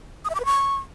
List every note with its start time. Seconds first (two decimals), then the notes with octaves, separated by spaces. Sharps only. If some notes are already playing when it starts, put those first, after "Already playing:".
0.25 D#6
0.30 E5
0.35 D6
0.40 B4
0.45 C#6